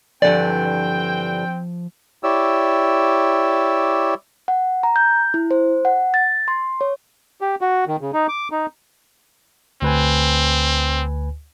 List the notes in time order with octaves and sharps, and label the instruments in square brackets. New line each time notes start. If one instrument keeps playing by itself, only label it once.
[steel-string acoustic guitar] G2 D3 E3 [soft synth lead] F3 [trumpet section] C4 G5 [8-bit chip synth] D5
[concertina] E4 G4 C#5 D5 E6
[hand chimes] F#5
A#5
G6
E4
C5
F#5
A6
C6
C#5
[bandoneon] G4
F#4
D#3
C#3
D#4
D6
D#4
[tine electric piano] D2 B4 G#5 [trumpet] C4